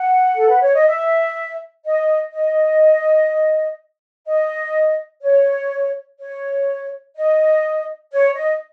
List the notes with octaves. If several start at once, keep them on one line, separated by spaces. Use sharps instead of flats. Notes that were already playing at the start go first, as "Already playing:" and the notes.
Already playing: F#5
A4
B4
C#5
D#5
E5
D#5
D#5
D#5
C#5
C#5
D#5
C#5
D#5